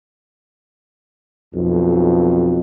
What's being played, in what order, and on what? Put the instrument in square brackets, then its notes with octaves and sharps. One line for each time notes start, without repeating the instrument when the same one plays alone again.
[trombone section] B1 F2